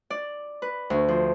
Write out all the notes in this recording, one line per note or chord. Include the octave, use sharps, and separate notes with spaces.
D5
B4
D2
F3